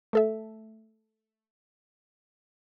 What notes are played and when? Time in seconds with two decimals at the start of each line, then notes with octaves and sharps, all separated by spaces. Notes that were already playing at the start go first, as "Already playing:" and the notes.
0.13 A3 A4 E5